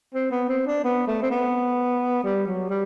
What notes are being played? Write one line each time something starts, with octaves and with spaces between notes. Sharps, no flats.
C4
B3
C4
D4
B3
A3
C4
B3
G3
F#3
G3